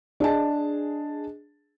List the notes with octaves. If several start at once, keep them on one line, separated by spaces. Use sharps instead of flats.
D4 G#4 D#5 A5